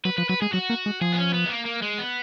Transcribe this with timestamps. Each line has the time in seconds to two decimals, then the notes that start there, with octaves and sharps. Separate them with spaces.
0.05 F#3 B4
0.18 F3 B4
0.29 F#3 B4
0.42 G#3 G#4
0.54 F#3 F#4
0.70 A#3
0.86 G#3
1.01 F3 G#4
1.12 B3
1.18 C#4
1.34 B3
1.46 G#3
1.49 A#3
1.66 A#3
1.82 G#3
1.99 B3